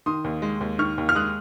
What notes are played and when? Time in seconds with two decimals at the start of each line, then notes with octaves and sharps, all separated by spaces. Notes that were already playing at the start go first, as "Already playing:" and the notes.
0.06 D#3 C6 D#6
0.24 D#2
0.42 G#3
0.61 D#2
0.79 D#3 C#6 F6
0.98 D#2
1.09 F6
1.15 G#3 D#6 F#6